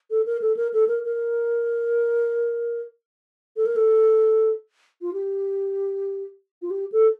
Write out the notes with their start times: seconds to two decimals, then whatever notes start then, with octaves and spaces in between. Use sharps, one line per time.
0.11 A4
0.26 A#4
0.42 A4
0.57 A#4
0.74 A4
0.88 A#4
1.05 A#4
3.57 A4
3.66 A#4
3.76 A4
5.02 F4
5.13 G4
6.62 F4
6.71 G4
6.92 A4